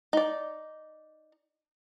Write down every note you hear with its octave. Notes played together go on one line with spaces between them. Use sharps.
D#4 D5